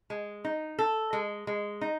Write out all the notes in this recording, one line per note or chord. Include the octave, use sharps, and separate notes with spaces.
G#3
D#4
A4
G#3
G#3
D#4